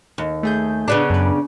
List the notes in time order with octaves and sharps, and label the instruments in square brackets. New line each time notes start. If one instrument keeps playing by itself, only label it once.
[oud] D#2
[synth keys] A3 G#4 G6
[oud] C#3 B3 D4
[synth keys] F#2 B4